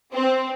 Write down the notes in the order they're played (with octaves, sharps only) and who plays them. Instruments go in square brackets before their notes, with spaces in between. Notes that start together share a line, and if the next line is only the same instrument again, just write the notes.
[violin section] C4